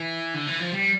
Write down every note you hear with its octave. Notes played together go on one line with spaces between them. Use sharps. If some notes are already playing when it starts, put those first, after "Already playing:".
Already playing: E3
D3
E3
F3
G3